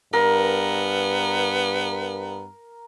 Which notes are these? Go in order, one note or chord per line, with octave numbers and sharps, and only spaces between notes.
G2 B3 A#4